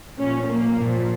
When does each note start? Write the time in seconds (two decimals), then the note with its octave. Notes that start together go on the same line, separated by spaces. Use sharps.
0.18 A#2 F3 C#4
0.47 A#3
0.76 A#2 F3